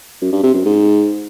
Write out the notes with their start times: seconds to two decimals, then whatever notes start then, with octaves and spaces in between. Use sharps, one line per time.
0.22 F#2
0.33 G2
0.43 C3
0.54 F#2
0.65 G#2